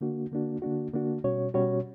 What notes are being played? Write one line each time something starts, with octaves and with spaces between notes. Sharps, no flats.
D3 A#3 D4 F#4
D3 A#3 D4 F#4
D3 A#3 D4 F#4
D3 A#3 D4 F#4
B2 G3 C#4 F#4 C#5
B2 G3 C#4 F#4 C#5